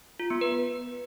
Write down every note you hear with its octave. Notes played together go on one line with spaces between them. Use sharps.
F4
B3
B4